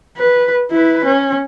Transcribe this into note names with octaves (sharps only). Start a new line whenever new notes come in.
B4
E4 B4
C#4